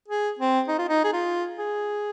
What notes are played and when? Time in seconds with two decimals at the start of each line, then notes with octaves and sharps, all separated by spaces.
0.08 G#4
0.39 C4
0.68 D#4
0.78 F4
0.89 D#4
1.04 G#4
1.13 F4
1.58 G#4